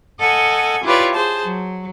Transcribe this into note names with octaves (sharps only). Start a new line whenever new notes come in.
A4 D#5 F#5 G#5
E4 F4 G4 B4 C#5 D5
G#4 C5 A5
F#3